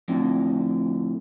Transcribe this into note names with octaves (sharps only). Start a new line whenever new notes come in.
F2 A2 D3